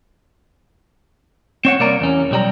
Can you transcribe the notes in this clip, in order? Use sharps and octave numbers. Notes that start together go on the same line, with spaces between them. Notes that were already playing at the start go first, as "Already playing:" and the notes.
C4 C#5 F#5
C2 A#3 D5 A#5
E2 C#4
B1 G3 A#5